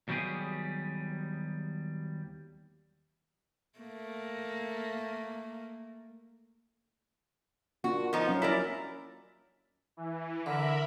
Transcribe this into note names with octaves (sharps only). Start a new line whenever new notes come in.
D#2 F#3 G3 B3 G4 G#4
A3 A#3
A#3 D4 F4 F#4
F3 B3 D#4
F#3 C#4 F5
E4 A#4 D5
E3
D3 A#4 E5 B5